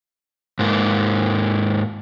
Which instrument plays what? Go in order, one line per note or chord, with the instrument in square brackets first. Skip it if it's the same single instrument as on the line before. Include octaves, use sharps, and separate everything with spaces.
[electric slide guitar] G#2 A#3